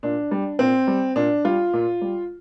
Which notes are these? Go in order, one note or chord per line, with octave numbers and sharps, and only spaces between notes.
A#2 D4
G3
A#2 C4
G3
A#2 D4
G3 F4
A#2
G3